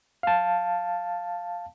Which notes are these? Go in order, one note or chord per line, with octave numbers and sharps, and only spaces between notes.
F5 A5